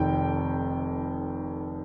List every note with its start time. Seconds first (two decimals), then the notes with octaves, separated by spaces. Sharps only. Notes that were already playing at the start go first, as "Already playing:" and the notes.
Already playing: F1 F2 D#3 G5